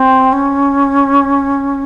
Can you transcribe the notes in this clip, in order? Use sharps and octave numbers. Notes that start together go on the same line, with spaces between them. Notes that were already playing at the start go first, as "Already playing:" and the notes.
Already playing: C4
C#4